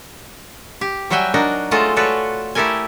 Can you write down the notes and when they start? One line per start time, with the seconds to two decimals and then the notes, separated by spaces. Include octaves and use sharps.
0.81 G4
1.10 F#3 G3 F#4 E5 G5 G#5
1.34 D4 D#4 F#4 A#4 D#5
1.71 F#3 G#3 A3 F4 A4 D#5
1.96 F4 F#4 A4 B4 C#5 D5
2.55 A3 E4 G4 A4 A#4 G#5